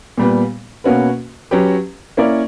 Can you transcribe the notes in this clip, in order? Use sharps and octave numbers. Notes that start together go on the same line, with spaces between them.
A#2 G3 B3
B2 A#3 C#4 F#4 B4
F#3 C#4 G4 B4
A#3 C#4 E4 A#4 D5